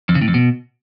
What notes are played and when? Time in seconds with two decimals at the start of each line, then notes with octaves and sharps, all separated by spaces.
0.09 F2
0.15 C#3
0.22 A2
0.28 F2
0.34 B2